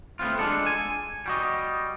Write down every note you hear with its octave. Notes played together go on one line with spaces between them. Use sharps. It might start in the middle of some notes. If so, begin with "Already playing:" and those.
A3 B3 C4 F4
G#3 D4 F4 A4
G#5
G3 F#4 D#5